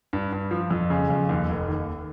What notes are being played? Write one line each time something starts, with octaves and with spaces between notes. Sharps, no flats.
G2
G2
F3
F2
C#3
F2
D#2
F1
D#2